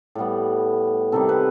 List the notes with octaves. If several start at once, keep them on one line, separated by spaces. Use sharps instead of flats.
A2 G3 B3
C3 D#3 G3 A4
B4